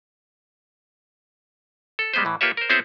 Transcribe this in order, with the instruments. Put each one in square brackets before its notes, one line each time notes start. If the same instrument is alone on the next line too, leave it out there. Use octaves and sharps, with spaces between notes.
[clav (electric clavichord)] A4
G3 G#3 B3 B4 C5
A2 E3
A#3 F4 G4 B4 C#5 E5
A#4 C5
B3 C4 E4 G#4 C5 C#5